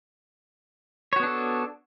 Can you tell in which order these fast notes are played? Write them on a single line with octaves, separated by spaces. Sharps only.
C#5 F#4 B3 D4 A4